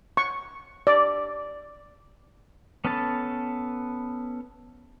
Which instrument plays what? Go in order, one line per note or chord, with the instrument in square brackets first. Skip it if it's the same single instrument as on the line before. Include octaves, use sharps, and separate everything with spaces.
[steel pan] C#6
D5
[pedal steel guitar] B3 C#4 A4 B4 A5